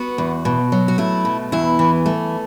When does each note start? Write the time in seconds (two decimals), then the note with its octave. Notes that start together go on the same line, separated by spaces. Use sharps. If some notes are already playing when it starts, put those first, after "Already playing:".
Already playing: B3 F#4
0.18 E2
0.45 B2
0.72 F#3
0.88 F#4
0.98 A3 E4
1.25 B2
1.52 E2 E4
1.79 E3
2.06 A3